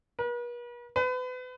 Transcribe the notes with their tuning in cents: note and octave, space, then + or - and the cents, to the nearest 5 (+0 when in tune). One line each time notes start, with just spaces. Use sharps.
B4 -45
B4 +35